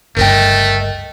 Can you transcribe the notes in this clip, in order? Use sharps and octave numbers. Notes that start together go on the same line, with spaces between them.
G1 C#2 G2 A3 A#4 D#5 G5